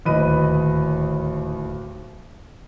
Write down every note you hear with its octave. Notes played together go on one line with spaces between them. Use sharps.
D1 D#2 B4 D#5 B5 D#7